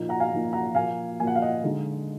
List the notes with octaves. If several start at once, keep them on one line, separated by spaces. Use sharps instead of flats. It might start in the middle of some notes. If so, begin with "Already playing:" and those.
Already playing: A#2 F3 A#3 D#4
F#5 A#5
F5 G#5
A#2 F3 A#3 D#4
F#5 A#5
A#2 F3 A#3 F5 G#5
A#2 F3 A#3 G#5
F#5
F5
D#5 F#5
D3 G#3 D#4